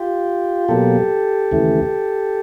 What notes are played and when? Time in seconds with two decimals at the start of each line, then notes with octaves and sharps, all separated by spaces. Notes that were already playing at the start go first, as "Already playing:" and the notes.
Already playing: F4 G4
0.68 B2 F#3 A#3 G4 A4
1.51 D#2 C#3 E3 A3